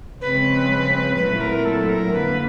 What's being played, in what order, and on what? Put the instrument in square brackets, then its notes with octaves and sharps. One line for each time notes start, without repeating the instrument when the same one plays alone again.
[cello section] C#3 F3 G#3 C4 [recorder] B4
[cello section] A#2 F#3 A3 C4 E4 [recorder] B4
[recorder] A#4
A4
A#4
[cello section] F2 D3 G3 A#3 [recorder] B4